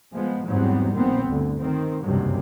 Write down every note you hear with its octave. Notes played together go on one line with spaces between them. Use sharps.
F3 G#3 B3
E2 G#2 F#3 G3 B3 C4
A#1 A#2 D#3 B3 C4
G1 D2 D3
D#3 C4
F#1 C#2 G2 C3 D#3 F#3